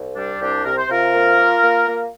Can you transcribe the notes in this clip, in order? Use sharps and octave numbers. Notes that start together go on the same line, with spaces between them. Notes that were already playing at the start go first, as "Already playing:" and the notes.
Already playing: C2
G3 D4
C2 D4 G4
C3 A#4
C5
C3 F4 A#4
A#3
A#3
A#3
A#3